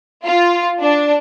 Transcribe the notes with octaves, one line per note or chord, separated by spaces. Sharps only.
F4
D4